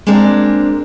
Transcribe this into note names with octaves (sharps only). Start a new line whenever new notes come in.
G#3 A#3 C4 D4 A#4